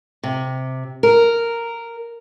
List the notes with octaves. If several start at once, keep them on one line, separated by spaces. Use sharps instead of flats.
C3
A#4